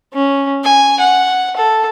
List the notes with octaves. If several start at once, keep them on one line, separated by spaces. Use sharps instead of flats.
C#4
G#5
F#5
A4